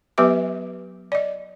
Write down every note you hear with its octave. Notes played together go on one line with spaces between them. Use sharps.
F#3 B3 G4 B4 E5 D6
D5 D#5